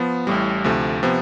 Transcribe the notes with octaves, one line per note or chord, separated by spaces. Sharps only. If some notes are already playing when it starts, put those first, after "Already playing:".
Already playing: F3 B3
A1 A2 G3
D2 C3 F3 A3
C3 F3 B3